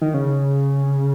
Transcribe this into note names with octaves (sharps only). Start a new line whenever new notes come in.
D#3
C#3